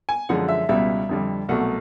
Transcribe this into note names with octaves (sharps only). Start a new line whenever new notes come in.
G#5
F#2 D3 F3 G#3 F#5
E5
C#2 B2 G3 E5
F2 D3 G3
C2 B2 F#3 A3 F#5